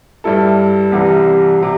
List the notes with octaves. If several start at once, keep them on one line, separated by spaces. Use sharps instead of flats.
G2 G3 E4 A4
C2 C3 E3 G3
C3